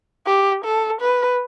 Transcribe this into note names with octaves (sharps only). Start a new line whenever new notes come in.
G4
A4
B4